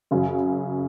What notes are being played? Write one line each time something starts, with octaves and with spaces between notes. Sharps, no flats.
F#2 C#3 F#3